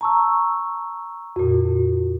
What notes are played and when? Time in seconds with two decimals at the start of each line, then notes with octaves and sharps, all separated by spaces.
0.01 A5 A#5 C#6 E6
1.36 F2 A#2 F#4